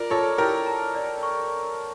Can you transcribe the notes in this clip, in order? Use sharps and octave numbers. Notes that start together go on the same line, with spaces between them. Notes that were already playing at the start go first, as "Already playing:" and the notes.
Already playing: F4 A#4 D5
F4 A4 C#5
E4 G4 A#4
A#5
D5
C#6